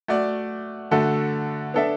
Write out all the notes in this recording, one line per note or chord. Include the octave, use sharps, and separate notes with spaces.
A3 F#4 D5
D3 A3 F#4 A4
B3 D4 A4 E5